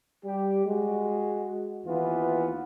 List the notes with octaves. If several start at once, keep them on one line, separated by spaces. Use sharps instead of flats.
G3 G4
G#3 F#4
D#2 E3 B3 F4